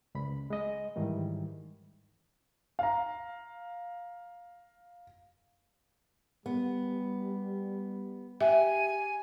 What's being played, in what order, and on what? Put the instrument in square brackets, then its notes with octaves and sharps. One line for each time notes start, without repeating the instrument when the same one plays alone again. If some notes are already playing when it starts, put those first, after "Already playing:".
[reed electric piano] C#2 B5
G#3 D#5
G#2 D#3 E3 G3
[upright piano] F5 A#5
[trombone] G3 [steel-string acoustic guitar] B3
[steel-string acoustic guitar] G4 [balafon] E5 [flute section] G#5